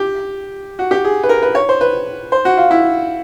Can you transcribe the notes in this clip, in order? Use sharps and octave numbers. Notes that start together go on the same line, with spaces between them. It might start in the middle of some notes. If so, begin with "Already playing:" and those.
Already playing: G4
F#4
G4
G#4
B4
A#4
B4
C#5
C5
B4
C5
F#4
F4
E4